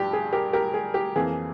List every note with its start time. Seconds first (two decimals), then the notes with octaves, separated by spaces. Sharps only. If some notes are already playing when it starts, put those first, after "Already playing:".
Already playing: G2 F3 G4
0.13 G#4
0.33 G4 A#4
0.53 G4 A#4
0.74 G#4
0.94 G4
1.15 F2 E3 A#3 G#4